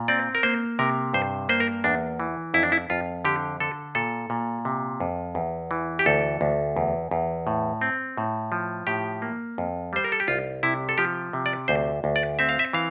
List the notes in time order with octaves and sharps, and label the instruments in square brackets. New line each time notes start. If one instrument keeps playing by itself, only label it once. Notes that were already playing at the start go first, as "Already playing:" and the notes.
Already playing: [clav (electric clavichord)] A#2
C4 D5
A#4
A#3 C5
C3 A#4
G2 C5
A#3 C5
A#4
E2 D4
E3
F2 E4
D4
E4
F2 F4
D3 G4
D3 A4
A#2 A4
A#2
C3
F2
E2
E3
G4
D2 A4
D2
E2
E2
A2
C4
A2
F3
A2 G4
A#3
F2
G3 C5
A#4
A4
G4
C2 F4
C3 E4
A4
F3 G4
C3
D5
D2 C5
D2
D5
C4 E5
F5
E5
E3 F5